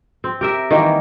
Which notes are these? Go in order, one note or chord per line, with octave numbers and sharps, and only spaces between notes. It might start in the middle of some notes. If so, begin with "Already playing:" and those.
C4
G4 A#4 E5
D#3 E3 G3 A#3